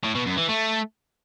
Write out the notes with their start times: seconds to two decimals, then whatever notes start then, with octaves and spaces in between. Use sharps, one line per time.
0.04 A2
0.15 B2
0.26 F#2
0.37 E3
0.49 A3